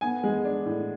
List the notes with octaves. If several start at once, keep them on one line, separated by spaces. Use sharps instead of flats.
B3 G#5
G#3
D4
A2